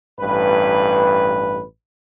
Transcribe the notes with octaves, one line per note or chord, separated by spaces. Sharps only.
A1 G2 B4